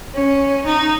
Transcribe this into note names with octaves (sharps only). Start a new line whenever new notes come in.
C#4
D#4